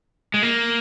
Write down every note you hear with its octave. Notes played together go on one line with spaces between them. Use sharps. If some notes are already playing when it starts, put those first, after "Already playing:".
G#3
A#3